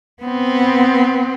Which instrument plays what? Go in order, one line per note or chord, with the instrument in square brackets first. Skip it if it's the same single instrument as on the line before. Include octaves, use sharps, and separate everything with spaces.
[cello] B3 C4